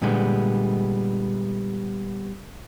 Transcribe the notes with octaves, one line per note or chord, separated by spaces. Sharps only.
A#2 D3 G3 G#3 B3